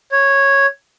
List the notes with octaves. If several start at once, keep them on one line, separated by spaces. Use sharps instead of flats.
C#5